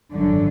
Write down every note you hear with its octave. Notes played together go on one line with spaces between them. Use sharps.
G#1 F#2 D3